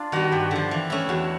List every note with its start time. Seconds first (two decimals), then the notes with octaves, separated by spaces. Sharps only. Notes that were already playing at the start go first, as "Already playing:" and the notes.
Already playing: D4 F4
0.12 D#3 G3 B3 F#4
0.32 G2 G4
0.51 D3 F3
0.71 E3
0.90 A3 C#4 E4
1.09 E2 F#4